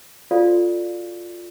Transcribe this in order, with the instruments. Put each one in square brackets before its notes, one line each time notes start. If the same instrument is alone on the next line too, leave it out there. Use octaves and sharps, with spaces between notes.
[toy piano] F4 F#4 A4 D5 F5